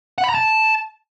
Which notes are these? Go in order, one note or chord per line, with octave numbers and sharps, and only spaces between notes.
F#5
B5
A#5
A5